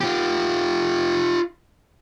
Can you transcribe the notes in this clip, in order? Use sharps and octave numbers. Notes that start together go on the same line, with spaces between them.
F4 G4